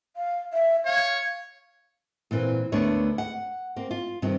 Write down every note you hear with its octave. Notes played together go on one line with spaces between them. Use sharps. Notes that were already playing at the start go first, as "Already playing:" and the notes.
F5
E5
C#5 F5
A#2 E3 C4 B4
D2 A3 B3 D4 A#4 C#5
F#5
A#3 C4
F4
G2 C3 D#3 B3 C4